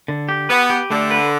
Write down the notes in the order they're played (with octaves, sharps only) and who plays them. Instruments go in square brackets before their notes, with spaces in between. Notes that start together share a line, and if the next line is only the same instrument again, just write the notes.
[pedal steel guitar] D3
G4
[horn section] B3 [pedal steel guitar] B4
[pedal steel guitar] G4
[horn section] D3 [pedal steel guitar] A3
[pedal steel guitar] B4